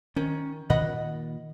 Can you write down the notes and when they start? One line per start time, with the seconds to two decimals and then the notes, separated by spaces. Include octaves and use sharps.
0.16 D#3 C#4
0.70 A#2 D#3 D#5 F#5 B5